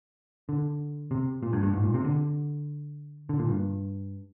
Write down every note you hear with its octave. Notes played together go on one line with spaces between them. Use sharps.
D3
C3
A#2
G2
G2
G#2
A#2
C3
D3
D3
A#2
G2